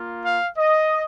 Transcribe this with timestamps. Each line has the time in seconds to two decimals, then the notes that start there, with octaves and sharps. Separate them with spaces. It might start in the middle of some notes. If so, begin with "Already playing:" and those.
Already playing: A#3 F4
0.24 F5
0.58 D#5